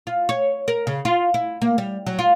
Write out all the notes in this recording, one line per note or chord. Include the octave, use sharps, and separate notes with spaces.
F4
C#5
A#4
C#3
F4
E4
A#3
G3
F#3
F4